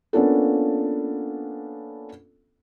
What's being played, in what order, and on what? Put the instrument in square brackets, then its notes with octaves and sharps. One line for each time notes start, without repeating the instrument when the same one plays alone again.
[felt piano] A#3 B3 C#4 D4 F4 A4